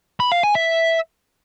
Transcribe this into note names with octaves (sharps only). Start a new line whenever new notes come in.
B5
F5
G#5
E5